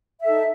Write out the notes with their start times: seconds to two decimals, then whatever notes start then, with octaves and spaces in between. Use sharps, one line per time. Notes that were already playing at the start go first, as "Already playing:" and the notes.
0.20 E5
0.24 A4
0.27 D#4